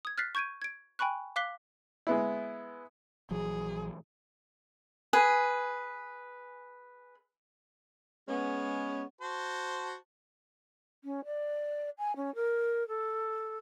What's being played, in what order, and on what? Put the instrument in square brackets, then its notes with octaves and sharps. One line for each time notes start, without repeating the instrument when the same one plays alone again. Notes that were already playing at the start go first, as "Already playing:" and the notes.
[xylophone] D#6 G#6
F6 F#6 A6 B6 C7
C#6 G6 G#6 D7 D#7
G#6 D7
G5 G#5 B5 C#6 F#6
F5 D6 F#6 B6 C7 G7
[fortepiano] G#3 B3 E4
[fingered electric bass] A#1 E3 F#3 [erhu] G#4
[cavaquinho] G#4 B4 G#5
[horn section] G#3 B3 C#4
[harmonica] F#4 C5 A5
[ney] C#4
D5
G#5
C#4
A#4
A4